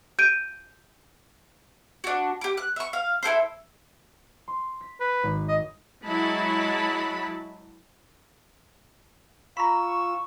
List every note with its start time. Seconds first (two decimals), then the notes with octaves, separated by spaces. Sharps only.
0.19 G6 D7 D#7
2.04 D4 F#4
2.41 G4 D6
2.57 F#6
2.76 E5 C#6
2.93 F5
3.23 E4 G4 A4 C5
4.48 C6
4.81 B6
5.00 B4
5.23 G#1
5.49 D#5
6.04 F#3 G#3 E4 A5 B5
9.57 F4 A#5 B5 C#6 E6